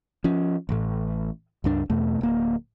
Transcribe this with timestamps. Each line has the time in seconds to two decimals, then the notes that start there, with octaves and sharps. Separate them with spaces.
0.24 F3 C#4
0.69 A1 A2
1.64 C#2 G2 D4
1.90 E2 B2 A3
2.21 D1 A#3